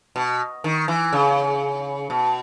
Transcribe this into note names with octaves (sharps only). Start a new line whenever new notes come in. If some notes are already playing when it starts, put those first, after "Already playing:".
B2
D#3
E3
C#3
B2